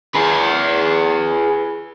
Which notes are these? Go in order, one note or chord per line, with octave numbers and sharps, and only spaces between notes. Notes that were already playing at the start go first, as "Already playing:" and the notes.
G#4 B4